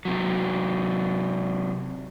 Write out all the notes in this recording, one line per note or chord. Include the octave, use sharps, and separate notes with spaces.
C3 F#3